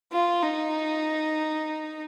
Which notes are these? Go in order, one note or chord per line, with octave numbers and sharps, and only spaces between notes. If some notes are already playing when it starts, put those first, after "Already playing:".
F4
D#4